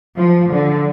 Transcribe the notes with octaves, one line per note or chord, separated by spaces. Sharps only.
F3
D3